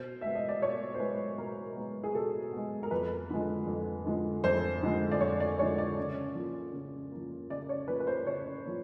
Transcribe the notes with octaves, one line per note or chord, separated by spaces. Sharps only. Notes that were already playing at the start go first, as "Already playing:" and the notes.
Already playing: B2 C5
G#3 B3 E5
D#5
D5
B2 C#5
C5
G#3 B3 B4
B2 A#4
G#3 B3
G#4
B2 A4
G#3 B3
A#4
F2 B4
D3 F3 G#3
F2
D3 F3 G#3
F2 C5
D3 F3 G#3
D5
F2 C#5
D5
D3 F3 G#3 C#5
D5
C#3
F3 A#3
C#3
F3 A#3
C#3 D5
C#5
F3 A#3 B4
B4
C5
C#3 C#5
F3 A#3